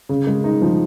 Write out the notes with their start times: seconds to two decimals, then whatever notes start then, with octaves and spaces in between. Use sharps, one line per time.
0.09 C#3
0.27 G#3
0.44 D#4
0.62 F3